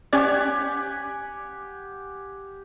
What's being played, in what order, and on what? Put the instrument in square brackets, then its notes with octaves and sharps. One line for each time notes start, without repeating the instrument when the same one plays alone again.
[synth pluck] C#4 C#5 D5 [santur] G4 F#5 G#5